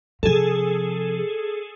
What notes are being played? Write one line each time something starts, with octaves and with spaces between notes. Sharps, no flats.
C3 F3 G#4 A4